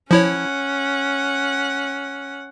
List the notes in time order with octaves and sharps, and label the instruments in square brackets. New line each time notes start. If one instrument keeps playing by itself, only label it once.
[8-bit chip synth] F3 E4 C#5 [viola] C#4 F#5